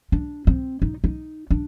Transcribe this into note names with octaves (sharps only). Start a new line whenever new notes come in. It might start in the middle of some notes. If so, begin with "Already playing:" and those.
D4
C4
D#4
D#4
D4